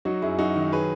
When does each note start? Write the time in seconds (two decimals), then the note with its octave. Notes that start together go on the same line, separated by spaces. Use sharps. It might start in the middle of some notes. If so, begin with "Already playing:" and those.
0.05 F#3 D#4 F#4
0.22 F#2 E4 G#4
0.39 F#2 D#4 F#4
0.56 D#3
0.72 F#3 G#4 B4